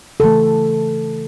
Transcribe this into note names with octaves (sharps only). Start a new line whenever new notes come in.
C#3 E3 A3 A4